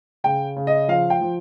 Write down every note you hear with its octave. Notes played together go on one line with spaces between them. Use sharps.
C#3 G5
C#3
D#5
F3 F5
G5
F3